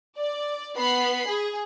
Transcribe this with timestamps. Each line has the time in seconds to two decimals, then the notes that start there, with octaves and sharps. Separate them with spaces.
0.17 D5
0.76 B3 B5 C7
1.27 G#4